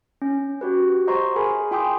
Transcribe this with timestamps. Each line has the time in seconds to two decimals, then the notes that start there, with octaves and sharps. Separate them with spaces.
0.22 C#4
0.61 F#4 G4 B4
1.07 C5 D#5 F#5 A#5 C6 C#6
1.36 G#4 A#4 G#5 B5
1.71 F4 G5 G#5 C6 D6 D#6